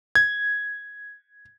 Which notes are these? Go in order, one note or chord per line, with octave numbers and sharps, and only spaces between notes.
G#6